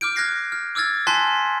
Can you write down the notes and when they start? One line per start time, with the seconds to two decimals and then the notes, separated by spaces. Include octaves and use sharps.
0.01 D6 F6 G6 D7
0.15 F6 F#6 G#6 A#6 C7 D7
0.52 F6
0.75 D6 E6 F6 G#6 A6
1.07 G#5 A5 C6 F#6 B6 C7